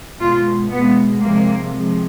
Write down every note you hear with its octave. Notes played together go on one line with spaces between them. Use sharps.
B2 G#3 F4
B2 G#3 B3
C3 F3 G#3 A#3
C3 F3 G#3